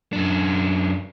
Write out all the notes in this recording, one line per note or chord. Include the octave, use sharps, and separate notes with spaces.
F#2 D4